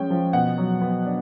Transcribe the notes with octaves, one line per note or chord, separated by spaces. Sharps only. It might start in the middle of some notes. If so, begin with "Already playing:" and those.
Already playing: F3 G#3 C#4 G5
F3
B2 F#5
F#3
B3
D4